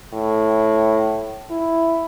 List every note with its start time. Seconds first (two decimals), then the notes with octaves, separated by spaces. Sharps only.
0.13 A2
1.51 E4